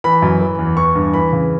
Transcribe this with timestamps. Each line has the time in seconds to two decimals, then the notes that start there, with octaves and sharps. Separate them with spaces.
0.04 E3 B5
0.22 F#2
0.40 E3
0.59 E2
0.77 E3 C#6
0.95 G2
1.14 E3 B5
1.33 C#3